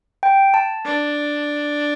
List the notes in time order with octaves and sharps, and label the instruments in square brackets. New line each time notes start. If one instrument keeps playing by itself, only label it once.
[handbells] G5
A5
[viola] D4